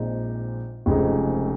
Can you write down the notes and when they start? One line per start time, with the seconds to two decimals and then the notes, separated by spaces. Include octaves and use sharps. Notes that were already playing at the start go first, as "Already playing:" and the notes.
Already playing: A#1 A#2 G#3 C4 D#4
0.86 F1 F2 C#3 G#3 D#4